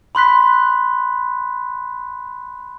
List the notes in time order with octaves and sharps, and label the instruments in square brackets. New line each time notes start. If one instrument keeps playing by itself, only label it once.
[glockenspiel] B5 C6 F#6 B6